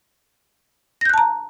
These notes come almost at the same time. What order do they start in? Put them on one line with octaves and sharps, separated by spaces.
A#6 G6 F#6 A5 A#5